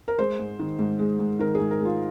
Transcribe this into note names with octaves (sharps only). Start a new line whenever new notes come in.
A#4
G#3 C5
G#2
D#3
G#2
G#3
G#2
D#3 A#4
G#2 G#4
A#4
G#3 F4